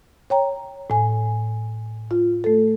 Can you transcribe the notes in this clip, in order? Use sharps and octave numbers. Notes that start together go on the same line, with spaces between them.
C#5 G5 A#5
A2 G#5
F4
A3 A4